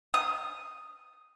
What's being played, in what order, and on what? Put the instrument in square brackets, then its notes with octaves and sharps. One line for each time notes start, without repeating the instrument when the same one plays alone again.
[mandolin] D#6